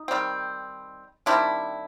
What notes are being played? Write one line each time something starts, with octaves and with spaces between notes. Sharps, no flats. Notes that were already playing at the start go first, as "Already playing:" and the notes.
Already playing: D#4
D#3 G3 C4
D#3 G3 C4 D4 E4